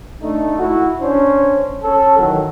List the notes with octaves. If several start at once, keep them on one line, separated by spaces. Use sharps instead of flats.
A3 D4 D#4
E4 F#4
C#4 D4 C5
C#4 A4
D#3 E3 F#3